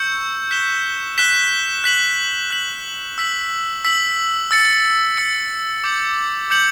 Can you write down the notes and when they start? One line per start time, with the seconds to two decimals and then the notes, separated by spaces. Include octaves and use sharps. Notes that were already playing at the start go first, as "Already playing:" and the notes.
Already playing: C#6 E6 G6 C#7
0.51 F#6 B6 E7 G7
1.18 F#6 B6 E7 G7
1.84 F#6 B6 F#7
2.51 F#6 B6 F#7
3.18 E6 B6 F#7
3.85 E6 B6 F#7
4.51 E6 A6 C#7
5.17 E6 A6 C#7
5.84 D6 G6 C#7 F#7
6.50 D6 G6 C#7 F#7